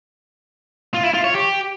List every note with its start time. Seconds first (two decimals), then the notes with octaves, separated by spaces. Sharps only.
0.94 F4
1.04 E4
1.14 F4
1.24 C#5
1.34 G4